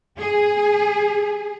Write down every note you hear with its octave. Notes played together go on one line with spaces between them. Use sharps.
G#4